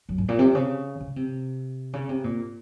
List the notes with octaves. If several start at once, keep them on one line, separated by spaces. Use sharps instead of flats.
F#2
G#2
A#2
C3
C#3
C#3
C3
C#3
C3
A#2